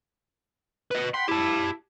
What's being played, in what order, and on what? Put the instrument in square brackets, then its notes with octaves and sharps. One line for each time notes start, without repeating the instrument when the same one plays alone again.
[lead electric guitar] B4 D#5
[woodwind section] F#5 G5 B5 [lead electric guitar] C6
[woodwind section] E4 [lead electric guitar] G4 A5